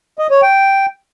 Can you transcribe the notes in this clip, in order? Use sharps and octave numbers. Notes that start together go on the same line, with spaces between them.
D#5
C#5
G5